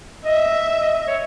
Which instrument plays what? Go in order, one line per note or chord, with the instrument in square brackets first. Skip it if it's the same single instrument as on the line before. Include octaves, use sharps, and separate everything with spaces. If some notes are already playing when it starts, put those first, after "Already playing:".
[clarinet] D#5 [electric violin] E5
[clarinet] D#5
C#5